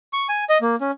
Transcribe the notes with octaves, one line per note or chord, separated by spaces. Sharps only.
C#6
G#5
D#5
A#3
C#4